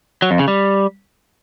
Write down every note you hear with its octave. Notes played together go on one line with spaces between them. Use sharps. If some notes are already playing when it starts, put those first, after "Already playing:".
F#3
F2
C#3
G3